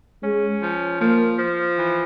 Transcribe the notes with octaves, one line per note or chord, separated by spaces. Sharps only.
G#3 C#4
F3
F3 A#3
F3
E3